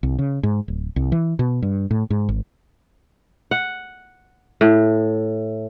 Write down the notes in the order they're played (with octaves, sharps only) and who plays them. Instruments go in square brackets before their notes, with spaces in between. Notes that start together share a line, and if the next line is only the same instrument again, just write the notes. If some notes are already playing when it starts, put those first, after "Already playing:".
[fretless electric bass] C2
C#3
G#2
D1
C2
E3
B2
G2
A2
G#2
G#1
[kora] F#5
A2